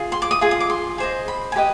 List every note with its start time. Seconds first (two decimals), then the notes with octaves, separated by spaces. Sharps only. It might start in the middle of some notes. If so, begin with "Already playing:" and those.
Already playing: F4 G#4
0.12 C6
0.22 D6
0.31 D#6
0.41 F4 G#4
0.51 D#6
0.60 D6
0.70 C6
0.98 G#4 C5 D#5
1.28 B5
1.52 G#5
1.56 G4 B4 D#5 B5